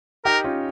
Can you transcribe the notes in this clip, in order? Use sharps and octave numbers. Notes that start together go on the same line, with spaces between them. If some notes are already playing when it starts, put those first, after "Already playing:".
D#4 G4 A#4
C#4 F4